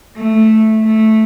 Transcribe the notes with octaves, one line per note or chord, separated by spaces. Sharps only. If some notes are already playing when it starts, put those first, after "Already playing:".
A3
A3